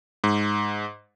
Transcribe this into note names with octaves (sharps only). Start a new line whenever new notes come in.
G#2